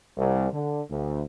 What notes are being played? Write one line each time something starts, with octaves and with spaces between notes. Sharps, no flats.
C2
D3
D2